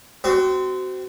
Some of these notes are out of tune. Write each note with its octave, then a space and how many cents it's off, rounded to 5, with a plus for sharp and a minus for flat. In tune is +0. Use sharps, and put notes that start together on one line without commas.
C4 -20 F#4 +20